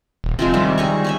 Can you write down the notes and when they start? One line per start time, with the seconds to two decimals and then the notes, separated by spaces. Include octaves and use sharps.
0.24 D#1
0.39 C3 F3 G#3 C4
0.54 D#3 G3 E5 D6
0.78 D#4 G#4 C#5
1.04 C#4 G#4 E5